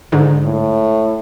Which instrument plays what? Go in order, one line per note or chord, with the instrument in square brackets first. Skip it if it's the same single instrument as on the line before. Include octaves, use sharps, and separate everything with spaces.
[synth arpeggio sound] G#2 D3
[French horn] A2